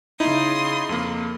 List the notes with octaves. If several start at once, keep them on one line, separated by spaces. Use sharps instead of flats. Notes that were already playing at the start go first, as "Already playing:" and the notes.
C#3 D#4 E4 C6 D#6
F2 A#3